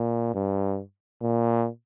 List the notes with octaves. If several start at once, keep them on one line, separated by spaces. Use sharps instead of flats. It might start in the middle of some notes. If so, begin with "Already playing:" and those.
Already playing: A#2
G2
A#2